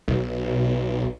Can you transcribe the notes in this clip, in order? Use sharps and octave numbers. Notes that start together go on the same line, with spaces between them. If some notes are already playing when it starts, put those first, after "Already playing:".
B1